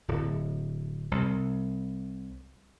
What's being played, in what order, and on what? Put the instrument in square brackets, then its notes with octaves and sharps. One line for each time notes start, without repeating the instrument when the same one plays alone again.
[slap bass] D1
C2